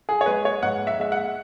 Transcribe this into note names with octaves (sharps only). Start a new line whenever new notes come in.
G#4
C#5
G#3 B4
C#5
G#2 F#5
E5
G#3 E5
F#5